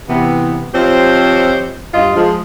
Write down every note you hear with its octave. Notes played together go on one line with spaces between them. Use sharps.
C3 E3 B3
F3 C4 G4 C5 C#5 D#5
G2 F4 D#5
F3 G#3